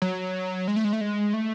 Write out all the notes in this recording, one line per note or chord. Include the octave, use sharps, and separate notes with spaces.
F#3
G#3
A3
G#3
A3
G#3
A3